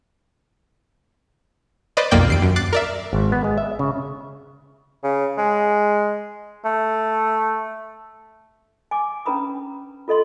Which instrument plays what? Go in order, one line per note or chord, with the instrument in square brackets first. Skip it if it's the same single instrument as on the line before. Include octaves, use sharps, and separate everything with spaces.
[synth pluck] B4 C5 D5 D#5
B1 F2 A#3 D5 G5 G6
D#2 C7 D7
F#2
D6 F#6 A6 C7 D7
A#4 D5 E5
[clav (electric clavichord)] G#1
B3
G#3
E5
C#3
[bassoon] C#3
G#3
A3
[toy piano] G#5 D6
C#4 D4 B4 A#5 B5 D#6
F4 A4 D#5 C6